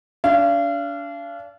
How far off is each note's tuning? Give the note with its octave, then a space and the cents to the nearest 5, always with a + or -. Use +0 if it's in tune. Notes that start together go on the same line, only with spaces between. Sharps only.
D4 -35 F5 -35